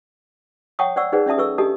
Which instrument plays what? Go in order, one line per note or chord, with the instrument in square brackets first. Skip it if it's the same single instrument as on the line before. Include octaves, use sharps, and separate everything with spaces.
[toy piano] C#5 F#5 G5 A5 C#6 D#6
C5 D5 F#5 C#6 E6
D#4 G#4 B4 C5 D5 F#5
C#4 D5 E5 A5 D#6
A4 B4 C#6 E6
D4 G4 A4 D#5 A5 D#6